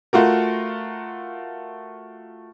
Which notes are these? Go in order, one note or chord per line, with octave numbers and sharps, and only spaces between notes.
A3 F4 F#4 A#4